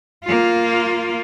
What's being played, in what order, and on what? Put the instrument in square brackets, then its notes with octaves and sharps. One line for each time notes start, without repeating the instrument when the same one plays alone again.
[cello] A#3 F4